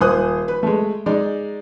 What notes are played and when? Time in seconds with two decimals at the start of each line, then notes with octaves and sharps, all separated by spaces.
0.01 D#1 C5 G#5 D#6 F#6
0.48 B4
0.63 G#3 A3
1.06 G#3 D#4 D5